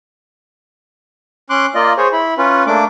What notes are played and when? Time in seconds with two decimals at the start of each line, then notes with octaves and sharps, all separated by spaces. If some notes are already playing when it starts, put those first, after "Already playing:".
1.50 C#4 C6 D6 F#6
1.75 A#3 F4 D5 D#5
1.97 G#4 C5 C#5
2.13 E4 B5
2.38 C#4 F4 B4
2.67 A3 A#3 D4 D6